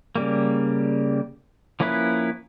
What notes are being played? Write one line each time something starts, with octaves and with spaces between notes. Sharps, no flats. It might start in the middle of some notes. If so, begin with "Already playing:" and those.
C#3 G3 A#3
F3 A#3 C#4 E4 B4